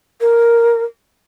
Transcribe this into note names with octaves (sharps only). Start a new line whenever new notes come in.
A#4